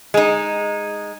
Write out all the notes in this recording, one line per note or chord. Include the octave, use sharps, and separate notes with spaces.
G#3 D#4